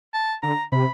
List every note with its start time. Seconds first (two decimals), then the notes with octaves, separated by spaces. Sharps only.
0.14 A5
0.43 D3 A#5
0.72 C3 B5